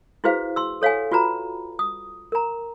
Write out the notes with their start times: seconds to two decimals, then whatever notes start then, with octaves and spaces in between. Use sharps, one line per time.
0.24 E4 F#4 G#4 B4 C5 F5
0.56 C6 E6
0.82 A4 C#5 F5 F#5 G#5
1.12 F4 F#4 B4 A#5 B5
1.79 D#6
2.32 A#4 A#5